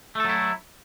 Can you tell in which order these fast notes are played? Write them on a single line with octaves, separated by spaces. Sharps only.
A3 A4 F#3 E4